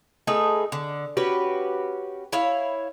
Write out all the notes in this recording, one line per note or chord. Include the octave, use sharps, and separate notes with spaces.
A3 D#4 G#4 B4
D3
C#4 F#4 G4 B4
E4 C#5 F5